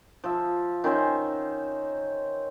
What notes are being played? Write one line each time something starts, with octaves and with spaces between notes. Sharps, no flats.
F3 E5
D#3 C#4 C5 E5